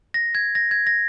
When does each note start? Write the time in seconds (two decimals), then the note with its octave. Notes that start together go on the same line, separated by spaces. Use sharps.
0.14 A#6
0.35 G#6
0.55 A#6
0.71 G#6
0.87 A#6